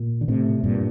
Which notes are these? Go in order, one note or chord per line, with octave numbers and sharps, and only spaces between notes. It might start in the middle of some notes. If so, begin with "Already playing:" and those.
Already playing: A#2
D3
A2 C3
G2 A#2